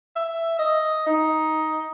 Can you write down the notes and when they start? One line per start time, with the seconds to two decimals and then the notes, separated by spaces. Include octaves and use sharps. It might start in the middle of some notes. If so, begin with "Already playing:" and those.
0.16 E5
0.59 D#5
1.06 D#4